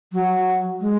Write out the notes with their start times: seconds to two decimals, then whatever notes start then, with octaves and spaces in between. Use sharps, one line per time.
0.13 F#3
0.81 G#3